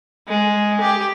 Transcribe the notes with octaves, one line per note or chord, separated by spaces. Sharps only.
G#3
G4